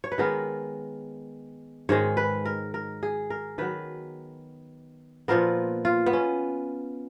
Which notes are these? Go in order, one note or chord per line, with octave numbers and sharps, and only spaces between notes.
C#5
B4
D#3 G#3 B3 A#4
G#2 D#3 G#3 C#5
B4
A#4
A#4
G#4
A#4
D#3 F#3 B3 B4
A#2 F3 B3 A#4
F4
B3
C#4